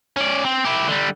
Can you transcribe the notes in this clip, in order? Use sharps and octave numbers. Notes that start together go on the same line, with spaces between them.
C#4 D5
C4
E4 G4
D3 G3